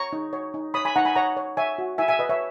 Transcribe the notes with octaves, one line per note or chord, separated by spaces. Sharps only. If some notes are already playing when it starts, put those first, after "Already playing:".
Already playing: C#5 A#5 C#6
D#4
C#5
D#4
C#5 B5 D#6
G#5 B5
D#4 F#5 A#5
G#5 B5
C#5 F#5 A#5
C#5
C#5 E5 G#5
F#4
E4 E5 G#5
E5 G#5
B4 D#5
C#5 E5